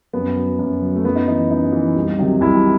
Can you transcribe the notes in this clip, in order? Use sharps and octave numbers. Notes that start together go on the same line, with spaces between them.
F#2 B3
F#3
F#2
F#3
A3
F#2 B3
D#4
E3 D#4
F#2 D#4
E3
C2
C3 D#3 F#3
C2 E4